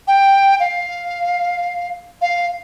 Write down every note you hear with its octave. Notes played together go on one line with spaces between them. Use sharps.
G5
F5
F5